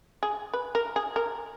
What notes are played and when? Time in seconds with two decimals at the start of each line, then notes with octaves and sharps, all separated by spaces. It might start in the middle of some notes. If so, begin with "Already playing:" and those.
0.23 G#4
0.53 B4
0.75 A#4
0.96 G#4
1.16 A#4